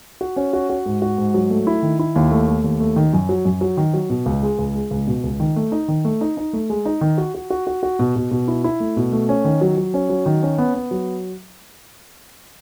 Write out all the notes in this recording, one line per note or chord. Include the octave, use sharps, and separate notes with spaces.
F#4
C#4
F#4
F#4
G#2
F#4
G#2
F#3
A3
E4
D#3
E4
D#2
A3
A3
D#2
A3
D#3
F#2
F#3
F#2
F#3
D#3
F#3
B2
C#2
G#3
C#2
G#3
C#2
B2
C#2
D#3
A3
D#4
D#3
A3
D#4
D#4
A3
G#3
D#4
D#3
F#4
F#4
F#4
F#4
F#4
B2
B2
B2
E4
E4
A3
B2
A3
C#4
D#3
F#3
F#3
C#4
F#3
D#3
C#4
B3
B3
F#3